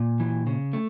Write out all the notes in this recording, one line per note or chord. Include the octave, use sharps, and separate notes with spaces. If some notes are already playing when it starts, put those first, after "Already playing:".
Already playing: A#2
E3
C#3
A3